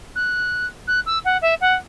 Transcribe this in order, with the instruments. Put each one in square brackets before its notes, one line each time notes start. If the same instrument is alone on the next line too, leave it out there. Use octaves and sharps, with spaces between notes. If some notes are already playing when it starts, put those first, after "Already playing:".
[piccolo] F#6
F#6
E6
F#5
E5
F#5